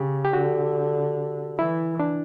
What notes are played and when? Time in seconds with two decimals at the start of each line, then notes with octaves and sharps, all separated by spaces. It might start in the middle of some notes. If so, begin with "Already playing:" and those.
Already playing: C#3 G4
0.25 G4
0.33 D3 F#4
1.58 E3 E4
2.00 D4